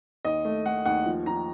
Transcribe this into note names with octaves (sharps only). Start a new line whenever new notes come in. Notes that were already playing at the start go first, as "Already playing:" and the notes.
D#2 D#5
A3
A3 F#5
D#2 F#5
F3
F3 A#5